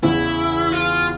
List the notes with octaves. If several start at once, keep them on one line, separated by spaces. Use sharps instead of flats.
E2 C#3 E3 E4
F4